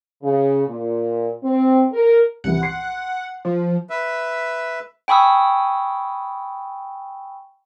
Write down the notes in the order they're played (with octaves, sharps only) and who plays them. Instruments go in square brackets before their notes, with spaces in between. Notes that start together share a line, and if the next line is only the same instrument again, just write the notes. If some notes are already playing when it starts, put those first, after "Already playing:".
[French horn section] C#3
A#2
C4
A#4
[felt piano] C2 E3 [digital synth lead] F#5
[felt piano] C6 C7
[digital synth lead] F3
[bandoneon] B4 E5
[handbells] G5 G#5 B5 C#6 D#6 E6